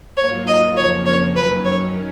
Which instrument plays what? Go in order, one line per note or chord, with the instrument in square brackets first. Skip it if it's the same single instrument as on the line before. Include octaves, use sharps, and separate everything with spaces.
[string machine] G#2 F#3 A#3 F4 [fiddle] C#5
[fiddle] D#5
[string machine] F2 C#3 F3 A#3 [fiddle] C#5
[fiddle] C#5
[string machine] F#2 D#3 F#3 C#4 [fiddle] B4
[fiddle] C#5